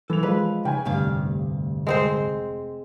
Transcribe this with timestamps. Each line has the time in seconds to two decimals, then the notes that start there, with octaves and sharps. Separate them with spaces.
0.10 E3 A4 F7
0.23 F3 G#3 B4
0.65 C#3 G5 G#5
0.85 F1 D2 G2 F5
1.87 G#3 C4 C5